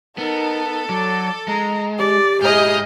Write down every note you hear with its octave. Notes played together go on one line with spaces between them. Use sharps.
B3 D#4 A4 A#4
F#3 D5
G#3 A#5
G4 D5
G#2 E4 G#4 D#5 F6 G6